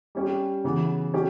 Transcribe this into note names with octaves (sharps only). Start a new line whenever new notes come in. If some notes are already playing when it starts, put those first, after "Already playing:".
G3 C#4 G4
C#3 E3 B3 F#4
F#3 C#4 G4